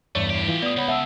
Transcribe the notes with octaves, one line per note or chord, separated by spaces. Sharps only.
E2 G2 A3 C#5 D5
A2 G4
E3 F4
B3 D5 D#6
C#2 C#5 F#5 B5
E5 F#5 A5 E6